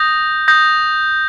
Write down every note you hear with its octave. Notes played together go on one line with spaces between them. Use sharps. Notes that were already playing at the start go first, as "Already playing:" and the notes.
Already playing: D#6 G6 A#6
D#6 G6 A#6